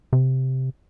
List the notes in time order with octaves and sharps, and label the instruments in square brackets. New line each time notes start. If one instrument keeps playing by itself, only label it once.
[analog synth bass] C3